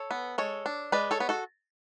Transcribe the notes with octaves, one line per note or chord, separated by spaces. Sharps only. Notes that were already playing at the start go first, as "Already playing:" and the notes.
Already playing: A4 C#5
B3
G#3 A4 C#5
D4
G#3 B4 D5
A4 C#5
B3
F#4 A4